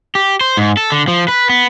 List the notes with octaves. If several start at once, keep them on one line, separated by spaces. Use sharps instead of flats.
G4
C5
G#2
A4
D3
F3
B4
B3